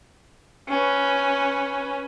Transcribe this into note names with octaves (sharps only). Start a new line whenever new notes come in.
C#4 B4